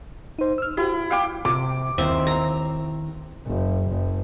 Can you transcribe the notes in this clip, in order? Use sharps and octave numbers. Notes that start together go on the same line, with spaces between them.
D#4 C5
E6 F6
E4 F#4 G4
F5 G5 D6
C3 D6
D#2 D#3 C4 E4 D#5 E5
A#5
F#1
F#1